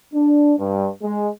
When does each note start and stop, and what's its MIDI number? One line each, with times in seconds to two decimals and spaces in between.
0.14 0.53 62
0.59 0.87 43
1.02 1.28 56